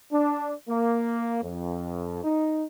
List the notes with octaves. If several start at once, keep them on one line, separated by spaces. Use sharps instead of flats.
D4
A#3
F2
D#4